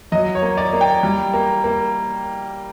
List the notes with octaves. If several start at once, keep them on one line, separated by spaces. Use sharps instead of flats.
F#3 D#5
C#5
A#3
D5
A#3
G5
G3
A#3
A#3